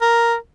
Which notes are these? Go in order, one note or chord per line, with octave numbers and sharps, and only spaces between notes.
A#4